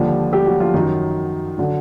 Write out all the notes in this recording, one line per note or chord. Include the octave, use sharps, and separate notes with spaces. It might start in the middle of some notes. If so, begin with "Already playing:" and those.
Already playing: D#2 D3 F3 G3 G4
G3 G4
F#3 F#4
F3 F4
F#2 D#3 F#3 D#4
D3 F#3